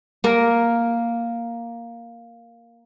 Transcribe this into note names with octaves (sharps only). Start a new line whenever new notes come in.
A#3 A#4